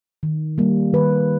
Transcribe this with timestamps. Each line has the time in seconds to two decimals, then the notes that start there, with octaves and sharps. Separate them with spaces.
0.23 D#3
0.58 G3 A#3
0.93 D#3 B4